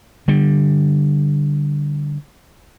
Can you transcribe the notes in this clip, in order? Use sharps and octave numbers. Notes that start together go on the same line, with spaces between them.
D3 G3